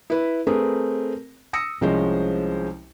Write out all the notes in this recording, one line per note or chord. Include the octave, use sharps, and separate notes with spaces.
E4 B4
A3 C4 G#4 A#4 B4
D#6 E6 A#6 C#7
C2 F3 G#3 C#4 C5